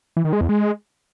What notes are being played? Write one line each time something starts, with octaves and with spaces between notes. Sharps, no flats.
E3
D#3
G#3
E2
G#3